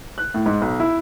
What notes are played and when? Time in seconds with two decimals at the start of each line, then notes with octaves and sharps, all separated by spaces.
0.18 F#6
0.34 A2
0.46 G#2
0.62 B1
0.80 E4